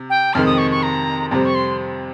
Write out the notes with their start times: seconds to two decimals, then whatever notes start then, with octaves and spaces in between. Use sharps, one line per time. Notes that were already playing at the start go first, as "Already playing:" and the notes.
Already playing: C3
0.10 G5
0.34 F2 C3 D#3 G#3 F6
0.46 D#6
0.58 C#6
0.71 C#6
0.83 A#5
1.30 F2 C3 G3 C4 A#5
1.45 C#6
1.55 C6